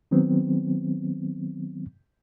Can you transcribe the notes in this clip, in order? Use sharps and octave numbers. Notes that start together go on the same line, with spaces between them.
D#3 F#3 B3 C4